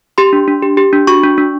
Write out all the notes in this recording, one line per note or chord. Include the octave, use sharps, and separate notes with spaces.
G4 C6
D4
D4
G4
G4
D4
F#4 C#6
D4
D4